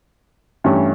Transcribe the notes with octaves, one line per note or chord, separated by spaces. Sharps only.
G2 E3 A3 C#4 G4